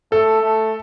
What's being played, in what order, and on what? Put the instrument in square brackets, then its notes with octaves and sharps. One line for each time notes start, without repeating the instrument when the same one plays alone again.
[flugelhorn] A3 [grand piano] A4
[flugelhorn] A3